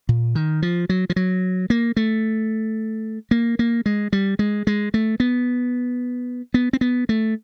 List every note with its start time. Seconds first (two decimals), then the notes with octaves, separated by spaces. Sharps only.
0.09 A#2
0.35 D#3
0.62 F3
0.89 F#3
1.10 F3
1.16 F#3
1.70 A#3
1.97 A3
3.31 A#3
3.59 A#3
3.86 G#3
4.13 G3
4.39 G#3
4.67 G#3
4.94 A3
5.20 B3
6.54 B3
6.73 C4
6.81 B3
7.09 A3